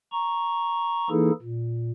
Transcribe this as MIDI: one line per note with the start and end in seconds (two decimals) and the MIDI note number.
0.12 1.09 82
0.12 1.09 85
1.10 1.31 52
1.10 1.31 58
1.10 1.31 63
1.10 1.31 64
1.10 1.31 68
1.10 1.31 69
1.42 1.91 46